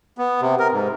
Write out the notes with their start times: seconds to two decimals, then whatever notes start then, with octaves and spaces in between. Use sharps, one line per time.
0.18 B3
0.41 C3
0.59 A#4
0.72 G#2